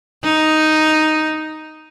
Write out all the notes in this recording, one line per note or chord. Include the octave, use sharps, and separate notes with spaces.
D#4